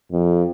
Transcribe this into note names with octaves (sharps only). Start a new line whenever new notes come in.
F2